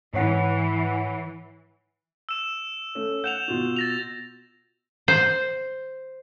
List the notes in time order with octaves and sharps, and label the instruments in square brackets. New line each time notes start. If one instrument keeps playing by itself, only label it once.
[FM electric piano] G#2 C#5 F#5 [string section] E3
[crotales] E6 E7
[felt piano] A3 C#4
[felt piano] F#5 [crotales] G6 E7 F7
[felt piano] B2 F4 F#4
[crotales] A6 A#6 F7
[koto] C5